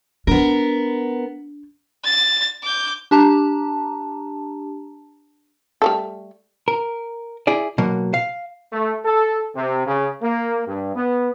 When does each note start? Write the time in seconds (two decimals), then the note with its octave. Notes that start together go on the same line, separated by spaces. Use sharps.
0.27 B3 D4 A#4
2.04 A6
2.63 D6 G6
3.11 D4 G4 A5 A#5
5.82 G3 A3 A4
6.68 A#4
7.47 E4 G#4 D5
7.78 B2 F#3 A#3
8.14 F5
8.73 A3
9.06 A4
9.56 C3
9.86 C#3
10.22 A#3
10.67 G2
10.96 B3